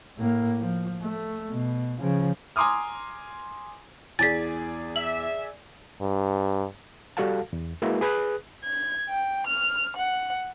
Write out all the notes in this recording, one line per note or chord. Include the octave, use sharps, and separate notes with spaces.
A2 A#3
F3
A3
B2
C#3 F3
G#5 A#5 C6 D6 D#6 F6
E2 G#4 D5 G#5 A6 B6
E5 F#7
G2
G3 F#4 A4 F5 F#5 A5
E2
G#3 A#3 E4 F#4 B4
G#4 B4 D#6 F#6
G#6
G5
F6
F#5